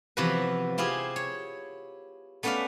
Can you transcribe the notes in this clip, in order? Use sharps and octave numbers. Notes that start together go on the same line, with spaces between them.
C3 E3 F3 B3 F#4 B4
C4 E4 F4 G4 G#4
C#5
A3 B3 C#4 B4 D5 F5